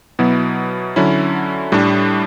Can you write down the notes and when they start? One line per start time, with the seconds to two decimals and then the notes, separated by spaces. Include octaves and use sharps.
0.19 B2 F#3 B3 E4
0.96 D3 F#3 C#4 E4
1.72 A2 G3 D4